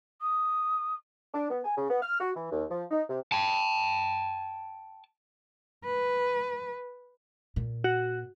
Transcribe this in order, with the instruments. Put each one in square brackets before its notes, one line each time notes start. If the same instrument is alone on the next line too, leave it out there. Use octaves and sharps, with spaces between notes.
[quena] D#6
[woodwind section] D4
B3
G#5
C#3
B3
F6
F#4
E3
D#2
F3
D#4
C3
[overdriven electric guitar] G5 A5
[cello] B4
[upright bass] A#2
[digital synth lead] F#4